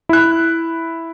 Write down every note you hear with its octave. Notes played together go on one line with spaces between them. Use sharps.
E4 F#6